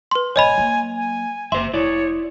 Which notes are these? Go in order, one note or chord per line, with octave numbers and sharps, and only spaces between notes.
B4 C6
G#1 B2 C#5 D#5 G#5 B5
F#3 A#3
G#5
F#1 C5 E5 C6
F1 E4 C#5 D5